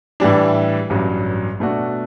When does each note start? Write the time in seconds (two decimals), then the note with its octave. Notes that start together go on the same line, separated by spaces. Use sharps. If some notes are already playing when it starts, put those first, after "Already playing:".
0.20 A2 E3 G3 D4
0.90 A1 G2 F#3
1.60 B2 A3 D4 F#4